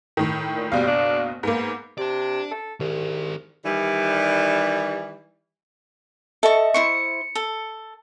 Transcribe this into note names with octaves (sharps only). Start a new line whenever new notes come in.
A2 D#3
A#2
F#1 B2 G3 F5
D4
G#2 A#3 B3
C3 D5 A5
A4
C2 D#3 G#4
D#3 E3 G3
A4 D#5 E5 C#6
E4 C5 C#6 C#7
A4